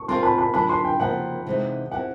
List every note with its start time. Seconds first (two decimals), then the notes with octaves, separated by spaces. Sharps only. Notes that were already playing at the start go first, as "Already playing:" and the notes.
Already playing: C#6
0.08 C4 F4 A#4 D5 F5 C6
0.23 B5
0.38 B5
0.54 D3 F#3 B3 D4 F4 B5
0.69 C6
0.85 G5
0.99 C#3 F3 A#3 F#5
1.46 C3 E3 G#3 C4 D#4
1.91 C4 E4 G4 F#5